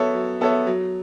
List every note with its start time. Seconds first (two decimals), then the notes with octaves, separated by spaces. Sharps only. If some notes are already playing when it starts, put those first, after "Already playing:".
Already playing: F#3 B3 A4 C#5 E5
0.15 F#3
0.41 B3 A4 C#5 E5
0.67 F#3